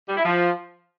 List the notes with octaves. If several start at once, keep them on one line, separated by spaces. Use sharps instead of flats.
G3
E4
F3